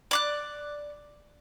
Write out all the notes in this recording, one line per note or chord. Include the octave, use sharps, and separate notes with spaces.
D5 D6 F#6